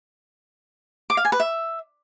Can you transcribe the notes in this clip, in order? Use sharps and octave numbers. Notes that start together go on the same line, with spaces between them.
D6
F5
G#5
B4
E5